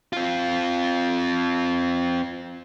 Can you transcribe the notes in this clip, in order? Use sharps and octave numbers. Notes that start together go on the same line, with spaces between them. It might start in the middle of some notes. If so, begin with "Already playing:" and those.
C4 F4